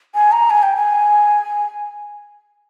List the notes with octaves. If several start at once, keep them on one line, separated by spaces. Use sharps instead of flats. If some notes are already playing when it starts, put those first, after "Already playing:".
G#5
A#5
G#5
G5
G#5